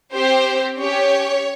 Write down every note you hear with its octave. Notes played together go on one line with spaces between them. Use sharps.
C4 G4 C5
C#4 G4 C#5